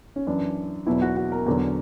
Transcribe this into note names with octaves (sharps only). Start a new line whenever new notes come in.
C#4
F#2 E3 D4
E2 B2 F#3 E4
F#4
F#4
A#4
E2 D3 F#3